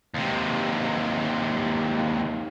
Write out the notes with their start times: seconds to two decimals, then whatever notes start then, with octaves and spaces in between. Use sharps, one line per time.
0.14 D#2 C3